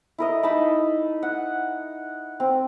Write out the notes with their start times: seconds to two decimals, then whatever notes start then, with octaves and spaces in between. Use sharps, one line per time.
0.18 E4 A#4 D#5
0.43 D#4 D#5 A5 B5
1.23 F#5
2.40 C4